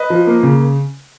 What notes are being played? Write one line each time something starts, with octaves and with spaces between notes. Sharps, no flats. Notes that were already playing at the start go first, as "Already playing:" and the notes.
Already playing: B4 D#5
F3
A#3
C#3